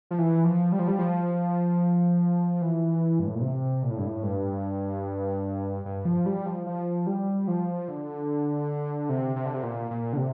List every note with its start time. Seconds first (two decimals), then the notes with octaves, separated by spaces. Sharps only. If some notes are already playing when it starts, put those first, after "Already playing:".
0.11 F3
0.18 E3
0.44 F3
0.72 G3
0.79 F3
0.88 G3
0.99 F3
2.62 E3
3.19 G2
3.27 A2
3.35 A#2
3.42 C3
3.83 A#2
3.90 A2
3.98 G2
4.07 A2
4.23 G2
5.85 G2
6.05 F3
6.26 G3
6.46 F3
6.66 F3
7.07 G3
7.48 F3
7.88 D3
9.09 C3
9.36 C3
9.46 D3
9.54 C3
9.63 A#2
9.91 A#2
10.13 D3
10.17 C3